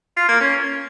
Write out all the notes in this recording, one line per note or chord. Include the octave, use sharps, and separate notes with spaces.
F4
A#3
C#4